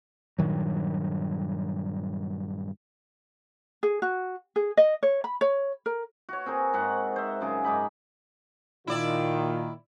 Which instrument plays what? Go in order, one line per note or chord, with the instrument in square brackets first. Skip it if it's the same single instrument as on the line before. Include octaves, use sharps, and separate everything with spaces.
[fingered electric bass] G2 A#2 D#3 F#3
[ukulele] G#4
F#4
G#4
D#5
C#5
B5
C#5
A#4
[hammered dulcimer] F#4 C#5
C4 G#4 A#4 C5
G#2 C4 F#5 C#6
C5 E5
F#2 C#3 G#4
G#2 D#4 B5 D6
[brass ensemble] A#2 D#3 [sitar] E4 D5 [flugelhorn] F4